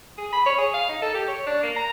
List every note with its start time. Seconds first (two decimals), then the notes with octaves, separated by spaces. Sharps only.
0.18 G#4
0.33 B5
0.46 C#5
0.58 G#4
0.74 F5
0.89 D#4
1.02 A4
1.15 G4
1.28 C#5
1.47 D4
1.63 A#3
1.77 A#5